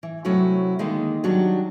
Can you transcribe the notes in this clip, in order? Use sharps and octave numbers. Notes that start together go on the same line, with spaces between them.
E3
C3 F#3 A3 C#4 E4 F#4
D3 D#3 G#3 A#3
D#3 F#3 G3 D4 F#4